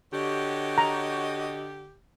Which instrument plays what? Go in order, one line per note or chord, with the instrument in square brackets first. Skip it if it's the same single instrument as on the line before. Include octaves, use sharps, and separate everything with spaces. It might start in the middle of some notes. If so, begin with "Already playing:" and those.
[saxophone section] D3 G4 [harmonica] F#4 C#5 D#5
[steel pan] A#5